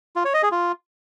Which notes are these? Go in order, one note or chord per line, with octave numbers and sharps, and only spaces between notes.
F4
C#5
D#5
G#4
F4